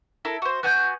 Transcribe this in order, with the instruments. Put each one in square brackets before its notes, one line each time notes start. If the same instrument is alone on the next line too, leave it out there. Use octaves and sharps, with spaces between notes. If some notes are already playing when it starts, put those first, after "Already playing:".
[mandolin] E4 A4 A#4
F#4 C5
[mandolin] B3 F#4 G#5 [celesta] F#6 G6